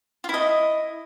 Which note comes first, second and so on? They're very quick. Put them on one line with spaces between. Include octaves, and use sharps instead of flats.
F4 E4 D#5